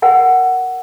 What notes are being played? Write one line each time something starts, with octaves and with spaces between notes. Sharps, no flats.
A#4 F#5 G#5